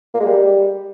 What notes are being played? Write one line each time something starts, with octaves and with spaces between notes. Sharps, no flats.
A#3
G#3
G3